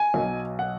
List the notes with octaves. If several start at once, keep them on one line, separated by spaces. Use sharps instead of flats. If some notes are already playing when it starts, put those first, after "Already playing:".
Already playing: G#5
B1 B2 F#3
F#5